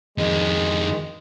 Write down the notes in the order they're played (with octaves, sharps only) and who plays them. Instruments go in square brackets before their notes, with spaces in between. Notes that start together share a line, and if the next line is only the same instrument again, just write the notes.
[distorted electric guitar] F2 D#3 [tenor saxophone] G#3